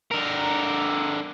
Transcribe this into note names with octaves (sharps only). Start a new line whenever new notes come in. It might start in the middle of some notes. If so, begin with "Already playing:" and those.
D3 A#4